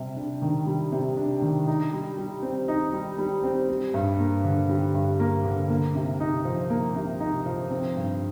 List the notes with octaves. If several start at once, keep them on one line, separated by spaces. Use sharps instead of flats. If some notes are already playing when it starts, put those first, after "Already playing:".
Already playing: C3 G3
D4
D#3
G3
C3
D4
D#3
D#4
G3
G3
C4
D#4
G3
G3
C4
G3
G2
A#3
D3
G3
G2
A#3
D3
A#3
C3
D#4
F3
A#3
C3
D#4
F3
C4
G2